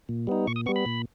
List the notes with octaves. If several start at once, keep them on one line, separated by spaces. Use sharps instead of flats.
A#2
G3 B3 D#4
A#2 C#6
D#6
G3 B3 C#6
B5
A#2